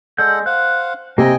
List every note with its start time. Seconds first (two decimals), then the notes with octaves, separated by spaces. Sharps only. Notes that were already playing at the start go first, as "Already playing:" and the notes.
0.18 G#3 A4 D5 F#5 G6
0.46 C5 F5 F#5 F#6
1.18 C3 A#3 E4 D#5 G5 G#5 A#5